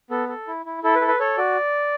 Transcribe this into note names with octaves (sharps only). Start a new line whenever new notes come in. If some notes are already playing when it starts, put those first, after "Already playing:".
B3 A4
A4
E4
E4
E4 A4
B4
A4
B4
A4 C#5
F#4 D5